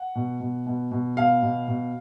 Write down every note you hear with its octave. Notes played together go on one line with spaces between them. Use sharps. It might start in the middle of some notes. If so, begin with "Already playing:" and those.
Already playing: F#5
B2
B2
B2
B2
B2 F5
B2
B2